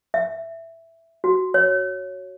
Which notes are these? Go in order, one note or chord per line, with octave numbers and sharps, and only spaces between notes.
E5
F#4
C#5